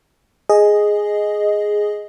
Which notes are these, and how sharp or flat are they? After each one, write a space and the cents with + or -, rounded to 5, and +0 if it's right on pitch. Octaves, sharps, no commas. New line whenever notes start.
G#4 +0 D#5 +0